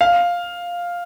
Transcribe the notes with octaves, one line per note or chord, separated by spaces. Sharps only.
F5